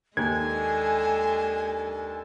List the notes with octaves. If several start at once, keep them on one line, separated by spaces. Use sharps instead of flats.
D#2 G#3 D4 A4 G#5 G#6